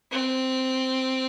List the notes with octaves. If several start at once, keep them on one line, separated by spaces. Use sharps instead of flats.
C4